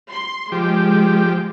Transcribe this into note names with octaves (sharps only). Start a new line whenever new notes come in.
C6
F3 G#3 G4